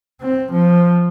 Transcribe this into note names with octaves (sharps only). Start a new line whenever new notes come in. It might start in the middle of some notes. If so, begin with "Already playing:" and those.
C4
F3